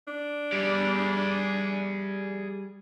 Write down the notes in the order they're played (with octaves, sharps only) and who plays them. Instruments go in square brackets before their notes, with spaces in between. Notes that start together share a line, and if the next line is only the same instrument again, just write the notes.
[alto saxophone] D4
[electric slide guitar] G3 [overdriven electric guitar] G#4 D5